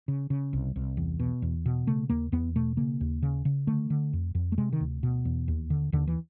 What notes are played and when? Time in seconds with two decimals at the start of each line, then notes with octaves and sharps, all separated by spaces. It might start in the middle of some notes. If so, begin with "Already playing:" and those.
0.08 C#3
0.30 C#3
0.53 C2
0.76 C2
0.97 E2
1.20 B2
1.42 E2
1.66 B2
1.87 C#3 A3
2.10 D#2 A#3
2.32 E2 B3
2.56 B2 A3
2.77 C#3 A#3
3.01 D#2
3.22 C#3
3.45 C#3
3.67 D3 A3
3.90 D3
4.13 F2
4.35 F2
4.52 A3
4.58 C3 G#3
4.73 D#3
4.80 D2
5.03 B2
5.25 E2
5.48 D#2
5.70 D3
5.92 D#2 D3
6.08 E3